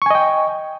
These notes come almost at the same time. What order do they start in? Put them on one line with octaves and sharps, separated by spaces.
C#6 G#5 D#5 G5